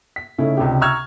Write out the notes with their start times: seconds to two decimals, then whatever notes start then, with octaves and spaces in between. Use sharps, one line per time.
0.16 B6
0.38 C#3 A3 C#4 D#4 E4
0.57 C#2 C3 D4 G4
0.81 A#5 C#6 E6 F6 G#6